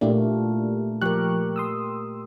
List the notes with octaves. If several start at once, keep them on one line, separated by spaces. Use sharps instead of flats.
A#2 A3 A#3 D4 E4 G4
F3 G4 A#4 C#6 F#6
C6 D#6 E6